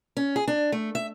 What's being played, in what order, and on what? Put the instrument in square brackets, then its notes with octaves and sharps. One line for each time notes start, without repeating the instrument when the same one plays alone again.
[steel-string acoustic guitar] C#4
G#4
D4
A3
E5